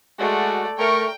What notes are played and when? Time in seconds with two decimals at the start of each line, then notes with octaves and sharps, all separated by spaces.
0.19 G#3 A3 F#4 D5
0.78 A3 A#4 G5 C#6